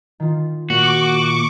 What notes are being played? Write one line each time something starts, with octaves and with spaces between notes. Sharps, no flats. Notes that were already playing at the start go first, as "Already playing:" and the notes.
D#3 F4
A#2 F#4 C#6 D6